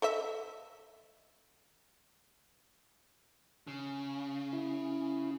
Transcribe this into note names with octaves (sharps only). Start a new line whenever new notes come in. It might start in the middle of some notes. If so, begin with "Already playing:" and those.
A4 D#5 E5
C#3
E4